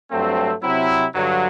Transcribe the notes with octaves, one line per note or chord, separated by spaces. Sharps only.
G2 F#3 A3 C4
C3 F#3 C4 E4
G2 D3 F#3